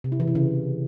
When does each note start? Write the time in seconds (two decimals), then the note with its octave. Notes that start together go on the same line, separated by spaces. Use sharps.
0.04 C3
0.12 E4
0.20 E3
0.28 C3
0.35 C#3